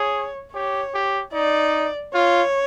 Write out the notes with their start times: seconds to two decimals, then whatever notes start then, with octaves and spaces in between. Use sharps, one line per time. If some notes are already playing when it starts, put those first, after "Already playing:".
Already playing: G#4 C#5
0.53 G4 C#5
0.94 G4
1.33 D#4 D5
2.14 F4 C#5